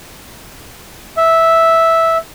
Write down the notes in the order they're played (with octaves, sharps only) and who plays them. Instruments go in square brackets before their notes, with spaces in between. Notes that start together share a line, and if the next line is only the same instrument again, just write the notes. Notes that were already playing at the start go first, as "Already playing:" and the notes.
[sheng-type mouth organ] E5